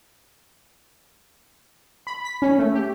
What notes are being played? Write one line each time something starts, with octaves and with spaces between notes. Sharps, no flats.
B5
B6
C#4
A3
G4